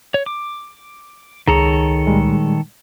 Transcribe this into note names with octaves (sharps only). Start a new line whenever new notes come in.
C#5
D6
C#2 D#3 G#4 A4 C#5 A#5
A#2 G3 G#3